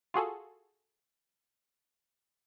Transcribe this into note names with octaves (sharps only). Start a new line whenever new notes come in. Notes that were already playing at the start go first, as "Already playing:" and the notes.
F4 F#4 G#4 A4